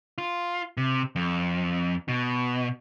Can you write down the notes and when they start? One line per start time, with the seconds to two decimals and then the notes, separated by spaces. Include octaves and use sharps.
0.18 F4
0.77 C3
1.16 F2
2.08 B2